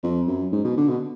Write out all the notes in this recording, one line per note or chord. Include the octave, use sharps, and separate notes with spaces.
F2
F#2
G#2
B2
D3
B2